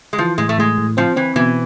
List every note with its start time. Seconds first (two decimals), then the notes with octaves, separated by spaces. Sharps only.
0.13 G#3
0.18 E3 F3
0.38 A2 G#3
0.49 A3
0.58 A2 G#3
0.78 A2
0.97 F3 C4
1.16 E3 C4
1.36 B2 E3